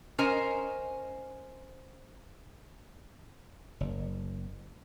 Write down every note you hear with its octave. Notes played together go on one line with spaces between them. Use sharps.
C#4 A#4 C5 D#5 G#5
F#1